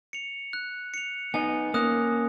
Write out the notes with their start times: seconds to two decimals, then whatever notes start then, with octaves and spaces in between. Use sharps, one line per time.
0.13 C#7 F7
0.53 F#6
0.94 C#7 F7
1.34 B3 D#4 G#5
1.74 A#3 C#4 D#6 F#6